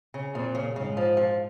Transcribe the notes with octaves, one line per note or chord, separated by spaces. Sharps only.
C#3
F2 A#2
C#3
G#2 C#3
F3
F3